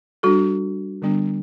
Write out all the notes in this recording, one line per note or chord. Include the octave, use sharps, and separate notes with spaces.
G3 D4 F#4 A4
D3 G3 B3 D4